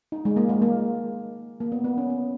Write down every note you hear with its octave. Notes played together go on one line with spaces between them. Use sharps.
D#4
G#3
A#3
G#3
A#3
A#3
B3
B3
C#4
B3